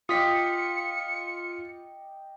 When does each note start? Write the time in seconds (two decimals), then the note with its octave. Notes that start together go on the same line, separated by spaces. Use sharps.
0.09 F4 G4 D#5 G5 D#6 B6 C#7